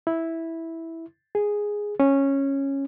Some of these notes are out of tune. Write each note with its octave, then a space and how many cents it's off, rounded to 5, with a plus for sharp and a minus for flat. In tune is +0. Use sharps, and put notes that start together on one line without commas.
E4 -5
G#4 -5
C#4 -10